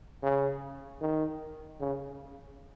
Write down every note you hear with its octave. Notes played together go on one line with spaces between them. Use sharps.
C#3
D#3
C#3